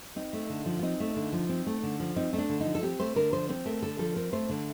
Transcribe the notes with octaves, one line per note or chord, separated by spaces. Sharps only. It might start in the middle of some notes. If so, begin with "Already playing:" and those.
C4 D#4
A3
D3
F3
F4
C4 D#4
A3
D3
F3
C4
A3
D3
F3
C4 D#4
A3 D#4
D4
D3
F3 D#4
A4
C4 G4
A3 C5
D3 A#4
F3 C5
C4 C5
A3 A#4
D3 A4
F3 A4
C4 A#4
A3 C5
D3